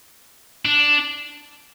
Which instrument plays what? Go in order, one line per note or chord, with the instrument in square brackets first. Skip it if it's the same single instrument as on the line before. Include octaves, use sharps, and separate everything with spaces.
[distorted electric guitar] D4